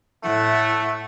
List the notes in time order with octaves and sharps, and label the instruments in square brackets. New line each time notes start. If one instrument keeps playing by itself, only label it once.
[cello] A2 F#5 [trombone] A3